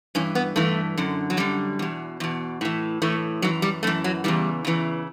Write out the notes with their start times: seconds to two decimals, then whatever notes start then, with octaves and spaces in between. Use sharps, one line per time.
0.15 G2 E3 C#4
0.35 B3
0.56 G2 E3 A3
0.97 F#2 D3
1.30 F#3
1.37 F#2 D3 G3
1.79 E2 B2
2.20 E2 B2
2.61 A2 E3
3.02 A2 E3 A3
3.42 F#2 E3 F#3
3.62 G3
3.83 F#2 E3 A3
4.04 F#3
4.24 E2 C#3 E3 G3
4.65 E2 C#3 E3